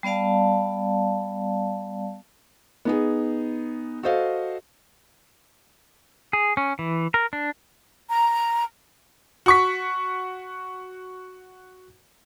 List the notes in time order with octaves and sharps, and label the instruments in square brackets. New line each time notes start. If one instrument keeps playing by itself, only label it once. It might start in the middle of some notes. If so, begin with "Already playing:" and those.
[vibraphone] G3 B3 D5 F5 A5
[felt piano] B3 D#4 G#4
F#4 A4 C5 D#5 F5
[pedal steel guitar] G#4
C#4
E3
A#4
D4
[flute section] A#5
[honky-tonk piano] F#4 C#6 B6